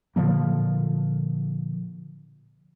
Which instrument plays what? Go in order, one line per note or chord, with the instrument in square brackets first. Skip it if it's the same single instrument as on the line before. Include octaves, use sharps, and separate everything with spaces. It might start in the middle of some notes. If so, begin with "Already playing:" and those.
[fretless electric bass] A#2 D3 F3 A#3